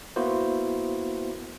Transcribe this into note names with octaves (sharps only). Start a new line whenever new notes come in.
A#3 B3 E4 F#4 C5